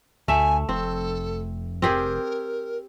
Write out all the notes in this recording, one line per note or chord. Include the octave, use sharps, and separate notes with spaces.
D2 A3 E5 G#5
F1 C4 A4
C4 G4 G#4 A#4